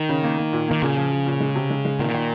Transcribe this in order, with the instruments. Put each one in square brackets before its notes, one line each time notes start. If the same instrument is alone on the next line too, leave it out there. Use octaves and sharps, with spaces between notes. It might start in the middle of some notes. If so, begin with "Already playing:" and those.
Already playing: [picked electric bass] D#3
[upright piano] C#3
A#3
A#3
A#2
[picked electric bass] D#3 [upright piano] A#3
[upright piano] A#2 [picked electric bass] C#3
[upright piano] F3
F3
A#2
G#3
C3
G#3
G#3
[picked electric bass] A#2 [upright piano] D#3
[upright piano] D#3